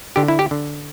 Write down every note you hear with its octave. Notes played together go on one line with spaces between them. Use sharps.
D3 G4
E4
G4
D3